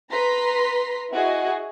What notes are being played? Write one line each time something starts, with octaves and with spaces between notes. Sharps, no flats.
B4 A#5 C6 B6
E4 F#4 G#4 D#5